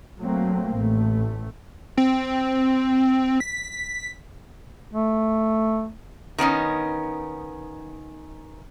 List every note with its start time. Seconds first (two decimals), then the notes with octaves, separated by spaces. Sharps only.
0.20 F#3 A3 A#3 C4
0.75 A1 A3
1.97 C4
3.40 B6
4.92 A3
6.38 D#3 B3 C#4 D#4